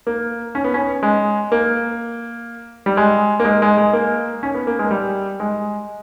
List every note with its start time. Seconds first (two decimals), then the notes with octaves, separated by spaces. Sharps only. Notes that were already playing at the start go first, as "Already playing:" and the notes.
0.07 A#3
0.55 C#4
0.64 B3
0.74 C#4
1.03 G#3
1.52 A#3
2.86 G3
2.97 G#3
3.40 A#3
3.45 G#3
3.62 G#3
3.78 G#3
3.93 A#3
4.43 C#4
4.54 B3
4.67 A#3
4.79 G#3
4.91 G3
5.40 G#3